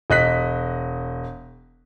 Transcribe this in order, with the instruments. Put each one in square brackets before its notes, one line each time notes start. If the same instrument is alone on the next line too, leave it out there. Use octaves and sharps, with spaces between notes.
[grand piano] E1 D#5 F#6 B6